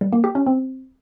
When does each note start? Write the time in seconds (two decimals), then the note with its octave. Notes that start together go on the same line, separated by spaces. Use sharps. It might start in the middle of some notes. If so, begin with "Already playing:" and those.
0.01 G3
0.13 A#3
0.24 G4
0.35 C#4
0.46 C4